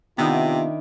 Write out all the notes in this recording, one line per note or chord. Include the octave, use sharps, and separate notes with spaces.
C3 D#3 B3 D4 E4 F4